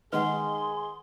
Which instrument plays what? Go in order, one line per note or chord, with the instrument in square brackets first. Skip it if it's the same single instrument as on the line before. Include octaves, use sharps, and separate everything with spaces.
[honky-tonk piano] D#3 G#3 [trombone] G#4 [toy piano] B4 F#5 [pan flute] C6